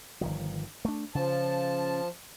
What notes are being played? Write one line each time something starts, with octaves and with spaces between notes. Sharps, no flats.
G1 D#3 F3
A3 D4
C#3 F3 A5